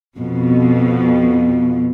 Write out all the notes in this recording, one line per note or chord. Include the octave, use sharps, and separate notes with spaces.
F2 B2